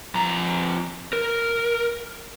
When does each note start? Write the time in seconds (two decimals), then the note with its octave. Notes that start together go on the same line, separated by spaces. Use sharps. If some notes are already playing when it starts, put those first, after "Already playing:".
0.15 F2 A#5
1.13 A#4